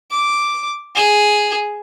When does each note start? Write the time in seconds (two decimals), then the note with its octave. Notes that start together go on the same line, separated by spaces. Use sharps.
0.11 D6
0.95 G#4